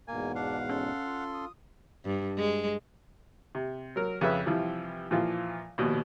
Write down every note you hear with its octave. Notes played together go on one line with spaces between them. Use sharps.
E2 G#2 B2 A#3 G#5
D4 F5 F#5
C#4 A4 C6
F4
D#6
G2
G#3
C3
F#3 A#4
F2 C#3 B4 E5
C3 E3 F3 G3
A#2 E3 F3 F4
A#1 D#2 B2